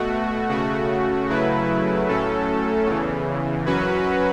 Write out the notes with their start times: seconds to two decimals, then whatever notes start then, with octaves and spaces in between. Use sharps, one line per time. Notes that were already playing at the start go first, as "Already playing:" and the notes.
Already playing: B2 A3 F#4
0.49 C#3 A3 F#4
1.29 C#3 F#3 A3 E4 B4
2.09 A2 F#3 A3 C#4 A4
2.87 E2 C#3 E3
3.66 F#2 F#3 C#4 F#4 B4